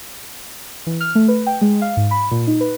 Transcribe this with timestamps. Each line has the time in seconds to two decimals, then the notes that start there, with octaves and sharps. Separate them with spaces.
0.87 E3
1.00 F6
1.15 A3
1.28 B4
1.47 G5
1.61 G#3
1.82 F5
1.97 G#2
2.11 B5
2.31 A#2
2.47 D#4
2.61 B4